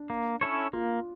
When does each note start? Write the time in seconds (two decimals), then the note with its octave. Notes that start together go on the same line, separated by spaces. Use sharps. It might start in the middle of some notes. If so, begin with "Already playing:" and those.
Already playing: D4
0.10 A#3
0.41 C#4 E4 A4 C#5
0.73 A#3 F4